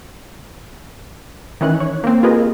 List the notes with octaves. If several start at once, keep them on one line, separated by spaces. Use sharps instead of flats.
D#3 E3 C#4 E4 F#6
C#5
A#3 C4
F4 G4 G#4 A#4 B4 D#5